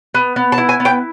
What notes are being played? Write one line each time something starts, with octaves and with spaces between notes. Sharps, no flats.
B3
B3
A5
E4
G#5
B3
G5